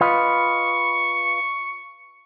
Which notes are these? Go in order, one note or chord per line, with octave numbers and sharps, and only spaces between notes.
F4 B4 D#5 C#6